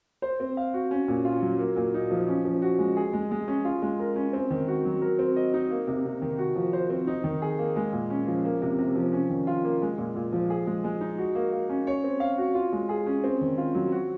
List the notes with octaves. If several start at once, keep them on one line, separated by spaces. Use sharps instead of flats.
C5
C4
F5
F#4
C#4
A#2
F4
F#3
A#3
A#2
D#4
F3
C#4
F3
F#4
G#3
G#4
G#3
G#3
C#4
F4
G#3
A#4
C#4
C4
D#3
F#4
F#3
A#4
C4
D#5
D#4
A#3
C3
C3
D#3
F#4
F3
C5
C4
D#4
D#3
G#4
A#3
G#3
A#2
C#4
F3
A#3
C3
C3
F3
C#4
D#3
F4
A#3
G#3
A#2
A#2
F3
G#4
G#3
G#3
D#4
F#4
A#3
A#3
C#4
C#5
C4
F5
F#4
F4
G#3
G#4
C#4
C4
D#3
F4
F#3
F#4